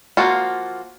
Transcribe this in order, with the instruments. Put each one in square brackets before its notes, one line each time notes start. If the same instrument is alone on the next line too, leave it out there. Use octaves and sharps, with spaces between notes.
[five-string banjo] F3 A#3 F4 F#4